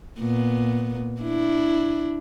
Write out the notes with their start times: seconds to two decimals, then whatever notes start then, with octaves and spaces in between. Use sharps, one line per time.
0.19 A#2 B3
1.21 D4 E4